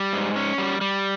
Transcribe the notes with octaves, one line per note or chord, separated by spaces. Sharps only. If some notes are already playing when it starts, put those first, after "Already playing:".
Already playing: G3
G#2
C#4
G3
G3